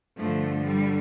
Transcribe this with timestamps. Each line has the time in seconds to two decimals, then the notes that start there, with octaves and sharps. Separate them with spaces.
0.18 G2 D3 F3 A3
0.65 G3